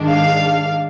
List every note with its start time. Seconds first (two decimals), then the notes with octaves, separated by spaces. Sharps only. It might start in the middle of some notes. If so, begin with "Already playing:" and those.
Already playing: G#2 D#3 G#3 D4
0.08 F5